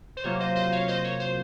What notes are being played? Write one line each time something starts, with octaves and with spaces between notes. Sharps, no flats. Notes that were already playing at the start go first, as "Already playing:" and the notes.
C5
C3 F#3 A#3 F4 C#5
C5 D#5
C5 D#5
C#5 F5
C5 D#5
C#5
C5